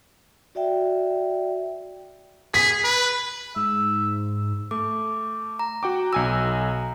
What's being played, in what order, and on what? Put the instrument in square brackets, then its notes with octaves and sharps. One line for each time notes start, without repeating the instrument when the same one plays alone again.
[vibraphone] F#4 D5 E5 G5
[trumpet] G#4 [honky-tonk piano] B6
[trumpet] B4
[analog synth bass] G#2 [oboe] E5
[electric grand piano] A3 [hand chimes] D6
[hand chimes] A#5
[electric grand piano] F#4 G5 D6
[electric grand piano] B1 G#5 E6 [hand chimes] A#5